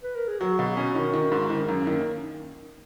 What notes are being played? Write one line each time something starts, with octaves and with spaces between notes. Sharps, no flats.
B4
A#4
G#4
F#3 F#4
B2
C#4 F#4
D#3
D#3
G#2
D#3 E4
F#2 D#4
C#4
D#3 A#3